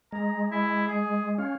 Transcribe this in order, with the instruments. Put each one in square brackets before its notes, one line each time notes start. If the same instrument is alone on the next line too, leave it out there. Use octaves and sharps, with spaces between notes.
[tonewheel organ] G#3 [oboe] A#5
[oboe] E4
G#4
[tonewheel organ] C#4 [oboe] F5